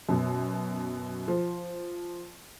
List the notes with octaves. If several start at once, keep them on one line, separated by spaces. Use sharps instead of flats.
F#2 B2
F3